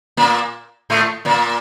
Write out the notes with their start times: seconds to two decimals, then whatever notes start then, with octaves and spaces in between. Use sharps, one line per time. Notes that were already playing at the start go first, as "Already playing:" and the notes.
0.17 A#2 A#3
0.90 A2 A3
1.25 A#2 A#3